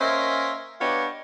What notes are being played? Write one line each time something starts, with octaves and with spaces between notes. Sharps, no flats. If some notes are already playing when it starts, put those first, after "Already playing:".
A#3 C#4 A#4 C5 D#5 E5
B3 D4 G4 C#5 D#5 F5